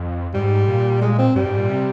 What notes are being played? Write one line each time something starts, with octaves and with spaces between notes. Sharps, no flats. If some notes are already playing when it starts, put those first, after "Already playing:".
Already playing: F2
G#2 G3
A#2
G#3
C4
G2 G3
G#2
A#2
C3